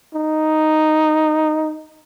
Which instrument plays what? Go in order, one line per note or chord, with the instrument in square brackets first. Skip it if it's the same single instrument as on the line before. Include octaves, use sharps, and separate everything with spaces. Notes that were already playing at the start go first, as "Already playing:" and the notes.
[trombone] D#4